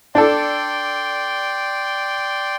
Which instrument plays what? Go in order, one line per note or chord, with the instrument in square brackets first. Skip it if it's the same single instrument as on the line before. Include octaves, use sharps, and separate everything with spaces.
[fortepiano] D4 A4 [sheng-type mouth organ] D5 G5 C6